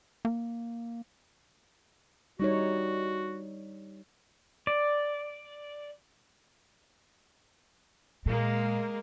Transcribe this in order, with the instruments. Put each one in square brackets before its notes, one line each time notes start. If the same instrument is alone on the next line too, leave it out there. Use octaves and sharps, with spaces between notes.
[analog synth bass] A#3
[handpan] G3 D#4 C#5 [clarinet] F#4
[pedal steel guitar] D5
[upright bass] A#2 [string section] G#3 A#3 A#4